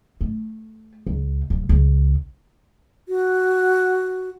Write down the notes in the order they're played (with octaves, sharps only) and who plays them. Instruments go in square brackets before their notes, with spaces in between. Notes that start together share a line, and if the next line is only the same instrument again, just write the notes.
[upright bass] A3
C#2
D1
C#2
[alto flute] F#4